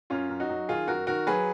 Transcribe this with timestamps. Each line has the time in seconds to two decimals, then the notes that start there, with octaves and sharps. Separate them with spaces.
0.10 F#2 C#4 F4
0.29 F#2
0.40 D#4 F#4
0.49 F#3
0.69 D#3 F4 G#4
0.87 F#2 F#4 A#4
1.07 D#3 F#4 A#4
1.27 F#3 G#4 B4